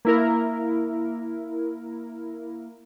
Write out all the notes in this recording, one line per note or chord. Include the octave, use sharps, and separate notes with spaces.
A#3 E4 A#4